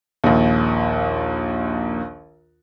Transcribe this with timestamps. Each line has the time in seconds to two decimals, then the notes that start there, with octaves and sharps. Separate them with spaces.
0.24 A#1 D#2